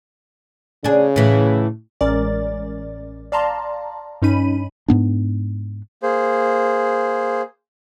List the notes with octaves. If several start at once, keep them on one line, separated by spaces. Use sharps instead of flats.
C#3 D4 G#4
A2 E3
A1 G#3 C#4 A#4 D5 A6
D5 F5 A5 A#5 C6
G2 C#4 D#4 B5 D#7
G#2 B3 D4
A#3 G#4 C5